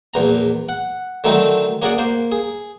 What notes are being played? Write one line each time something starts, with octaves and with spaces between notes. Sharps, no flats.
A#1 E2 A#5
F#5
D3 D#3 F#3 A3 C4 D#4
A#3 C#4 F#4 G#4 D5 F#5
A#3 C5
G#4